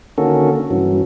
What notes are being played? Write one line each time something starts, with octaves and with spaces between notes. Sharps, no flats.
D3 D#3 A#3 C#4 F#4 A4
G2 C#3 E3 F#3